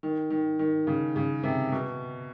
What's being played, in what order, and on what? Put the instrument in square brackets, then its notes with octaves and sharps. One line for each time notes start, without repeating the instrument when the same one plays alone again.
[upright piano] D#3
D#3
D#3
C#3
C#3
C3
B2